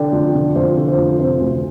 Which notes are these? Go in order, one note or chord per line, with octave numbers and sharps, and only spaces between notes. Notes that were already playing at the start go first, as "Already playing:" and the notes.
Already playing: D3 D5 G5
F2
D3
F2 C5
D3
C5
F2
C3 C5
D2